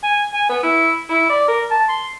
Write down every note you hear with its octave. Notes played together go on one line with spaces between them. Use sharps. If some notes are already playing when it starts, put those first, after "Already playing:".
G#5
G#5
B3
E4
E4
D5
A#4
A5
C6